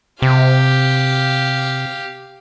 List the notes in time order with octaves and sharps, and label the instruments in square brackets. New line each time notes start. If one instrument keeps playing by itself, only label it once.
[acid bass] C3 [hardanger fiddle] G4 F5